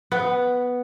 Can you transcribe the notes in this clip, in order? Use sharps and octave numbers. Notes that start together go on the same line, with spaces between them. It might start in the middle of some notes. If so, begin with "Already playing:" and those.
B3